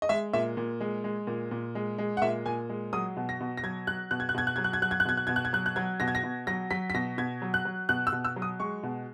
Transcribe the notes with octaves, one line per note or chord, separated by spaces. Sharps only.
D#5
G#3 E5
A#2 E5
A#2
G#3
G#3
A#2
A#2
G#3
G#3
F#5
A#2 E5
A#2 G#5
G#3
F#3 D#6
B2
A#6
B2
A#6
F#3 G#6
F#3 F#6
B2 F#6
G#6
F#6
B2 G#6
F#6
F#3 G#6
F#6
G#6
F#3 F#6
G#6
F#6
B2 G#6
F#6
B2 G#6
F#6
G#6
F#3 F#6
F#6
F#3 G#6
B2 A#6
G#6
A#6
B2
F#3 A#6
F#3 B6
B6
B2 A#6
B2 G#6
F#3
F#6
F#3
B2 F#6
E6
B2
E6
F#3
D#6
G#3 C#6
B2